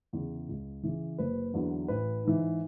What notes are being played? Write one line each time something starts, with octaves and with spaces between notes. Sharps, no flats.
E2 C#3
C#2
C#3 E3
F#1 B4
E2 D3 F#3
A1 B4
G#2 E3